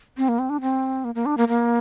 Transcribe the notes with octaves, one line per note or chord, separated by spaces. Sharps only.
C4
A#3
C4
D4
C4
A#3
A#3
D4
A#3
A#3